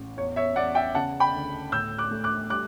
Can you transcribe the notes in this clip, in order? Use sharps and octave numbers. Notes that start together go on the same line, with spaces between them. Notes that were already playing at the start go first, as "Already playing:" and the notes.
Already playing: A1
E2 C#5
C#5 E5
E2 D5 F#5
E5 G5
C#3 F#5 A5
G5 B5
D2
A2 E6 G6
D6 F#6
A3
D6 F#6
G3 D6 F#6